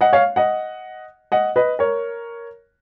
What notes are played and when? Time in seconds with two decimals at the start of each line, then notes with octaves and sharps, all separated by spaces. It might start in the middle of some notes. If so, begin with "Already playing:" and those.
0.01 D#5 F#5
0.13 C#5 F5
0.36 D#5 F#5
1.32 D#5 F#5
1.56 B4 D#5
1.79 A#4 C#5